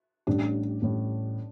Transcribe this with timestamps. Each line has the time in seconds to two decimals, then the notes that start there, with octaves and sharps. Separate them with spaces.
0.27 A1 A2 G3 D4
0.82 A1 A2 G3